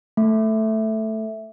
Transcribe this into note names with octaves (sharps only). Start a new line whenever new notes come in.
A3